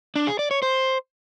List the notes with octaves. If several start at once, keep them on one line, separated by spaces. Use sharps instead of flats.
D4
G#4
D5
C#5
C5